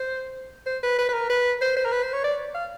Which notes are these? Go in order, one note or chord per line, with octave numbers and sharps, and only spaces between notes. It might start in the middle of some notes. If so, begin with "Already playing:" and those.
Already playing: C5
C5
B4
B4
B4
A#4
B4
C5
C5
A#4
B4
C5
C#5
D5
F5